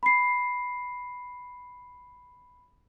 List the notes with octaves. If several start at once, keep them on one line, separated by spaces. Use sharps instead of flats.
B5 C7